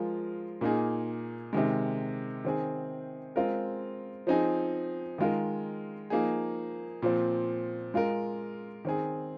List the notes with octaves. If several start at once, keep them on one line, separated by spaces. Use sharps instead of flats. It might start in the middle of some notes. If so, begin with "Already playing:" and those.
Already playing: F3 G#3 F4 A#4
A#2 A#3 D#4 G#4
C3 D#3 G#3
D#3 C4 G#4
G#3 C4 F4 A#4
F3 C4 D#4 G#4
D#3 G#3 F4 A#4
F3 A#3 D#4 G#4
A#2 F3 C4
G#3 F4 A#4
D#3 C4 G#4